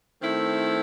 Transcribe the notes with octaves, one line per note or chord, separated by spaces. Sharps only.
D#3 A3 C4 E4